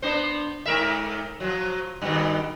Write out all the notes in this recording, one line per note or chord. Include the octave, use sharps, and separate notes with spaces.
B3 D4 C5
G#2 A#4 E5
F3 F#3
G2 B2 D#3